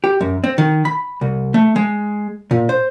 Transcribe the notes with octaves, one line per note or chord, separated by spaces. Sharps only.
G4
F#2
C4
D#3
B5
C2
A3
G#3
A#2
C5